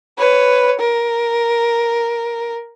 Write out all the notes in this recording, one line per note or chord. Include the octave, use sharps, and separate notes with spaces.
B4 C#5
A#4